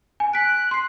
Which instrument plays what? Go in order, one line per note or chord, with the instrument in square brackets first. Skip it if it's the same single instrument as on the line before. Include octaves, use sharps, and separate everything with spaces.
[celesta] G#5
[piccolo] F#6 [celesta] B6 D7
[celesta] C6 C7